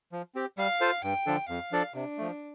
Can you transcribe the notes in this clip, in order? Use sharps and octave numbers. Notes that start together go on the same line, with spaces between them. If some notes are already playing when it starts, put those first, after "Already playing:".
F3
C4 G4
G3 F5
F4 A4 C5
G2 G5
D3 F3 D4 A4
F2 F5
F3 D4 A4 D5
C3 D4
F3 A3